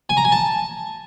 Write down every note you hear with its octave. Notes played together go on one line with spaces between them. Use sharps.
G#5
A#5
G#5
A5